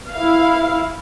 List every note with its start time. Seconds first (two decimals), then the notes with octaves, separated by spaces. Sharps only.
0.14 E4 F5